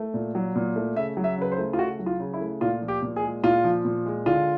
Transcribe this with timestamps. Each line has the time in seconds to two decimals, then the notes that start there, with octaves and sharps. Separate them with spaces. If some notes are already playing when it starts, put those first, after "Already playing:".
Already playing: A3
0.14 A#2
0.35 F#3
0.56 A#2
0.76 A3
0.96 C#3 E5
1.17 F#3
1.24 E5
1.38 C#3 B4
1.52 C5
1.58 A3
1.73 F4
1.79 C#3 F#4
1.99 F#3
2.06 F4
2.20 C#3
2.34 E4
2.41 A3
2.61 A#2 F4
2.82 F3
2.88 G4
3.02 A#2
3.16 G#4
3.23 G#3
3.43 A#2 F4
3.64 F3
3.85 A#2
4.06 G#3
4.26 D3 F4